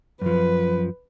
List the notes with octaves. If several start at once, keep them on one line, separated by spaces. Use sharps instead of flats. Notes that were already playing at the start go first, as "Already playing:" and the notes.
F#2 F3 B4